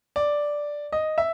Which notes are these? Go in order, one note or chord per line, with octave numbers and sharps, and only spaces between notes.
D5
D#5
E5